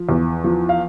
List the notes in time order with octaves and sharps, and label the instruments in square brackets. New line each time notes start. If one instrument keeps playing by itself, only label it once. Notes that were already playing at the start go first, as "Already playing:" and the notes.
Already playing: [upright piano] F3
E2
F3
F5